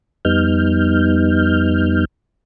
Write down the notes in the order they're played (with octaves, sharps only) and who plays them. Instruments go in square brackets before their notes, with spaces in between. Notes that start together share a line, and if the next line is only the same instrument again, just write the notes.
[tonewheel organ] F2 G3 B3 D#4 F6 G6